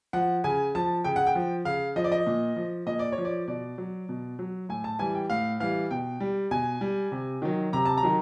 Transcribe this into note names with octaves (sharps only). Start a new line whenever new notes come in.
F3 F#5
C#3 G#5
F3 A5
C#3 G5
F#5
G5
F3
C#3 F5
F3 D#5
D5
D#5
A#2
F3
A#2 D#5
D5
C#5
F3
D5
B2 D5
F#3
B2
F#3
A2 G#5
A5
E3 G3 G#5
G5
A2 F5
E3 G3 F5
B2 G5
G3
B2 G#5
G3
C3
D#3 F#3
C3 A#5
A5
A#5
D#3 F#3